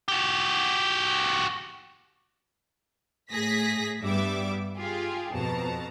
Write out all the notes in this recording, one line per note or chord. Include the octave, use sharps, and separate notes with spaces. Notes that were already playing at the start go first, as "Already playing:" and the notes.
F#4 G4
A2 G#4 A#6 B6
G2 G3 B3 E5 D6
F4 G4 G#4
F2 B2 A5 A#5